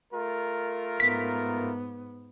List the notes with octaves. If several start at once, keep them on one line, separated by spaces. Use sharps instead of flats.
A3 F4 A#4
G#2 B3 B6